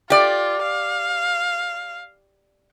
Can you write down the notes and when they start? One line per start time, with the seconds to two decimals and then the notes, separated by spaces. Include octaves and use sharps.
0.10 F4 G4 D5
0.63 F5